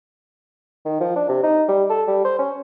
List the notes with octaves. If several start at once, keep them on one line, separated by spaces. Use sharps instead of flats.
D#3
F3
D4
C3
D#4
G3
A4
G3
C5
C#4